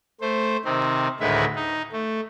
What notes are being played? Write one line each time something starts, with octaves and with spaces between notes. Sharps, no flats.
A3 C5
C3 D#3 C4
D2 A2 D#3 G#3 B4 E5
D#4
A3